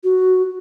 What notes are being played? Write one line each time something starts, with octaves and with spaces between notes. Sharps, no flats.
F#4